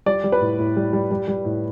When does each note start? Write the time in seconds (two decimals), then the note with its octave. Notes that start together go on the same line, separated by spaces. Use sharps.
0.06 G3 D5
0.24 G3
0.32 B4
0.41 A2
0.59 A2
0.76 G3
0.93 G3
1.11 G3
1.28 G3
1.45 A2